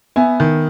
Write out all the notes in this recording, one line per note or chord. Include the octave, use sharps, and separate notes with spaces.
B3 E5 G#5
D#3